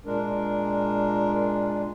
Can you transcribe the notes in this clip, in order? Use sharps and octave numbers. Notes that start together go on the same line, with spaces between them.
A#2 G#3 D4 A#4